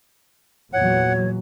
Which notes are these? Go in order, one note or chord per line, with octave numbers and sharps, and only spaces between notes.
E2 A#2 E3 F#3 C#5 F#5